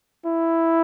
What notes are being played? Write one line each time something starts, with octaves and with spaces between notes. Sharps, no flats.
E4